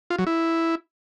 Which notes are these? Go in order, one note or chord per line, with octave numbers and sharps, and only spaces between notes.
F4
F#3
E4